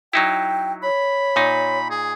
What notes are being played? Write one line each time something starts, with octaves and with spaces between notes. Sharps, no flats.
F#3 D#4 E4 G5
C#5 B5
A#2 D#4
G#4